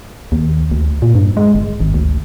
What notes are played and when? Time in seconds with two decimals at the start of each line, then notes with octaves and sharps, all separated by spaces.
0.32 D#2
0.72 D2
1.02 A#2
1.15 G2
1.37 G#3
1.55 G1
1.80 G#1
1.94 D2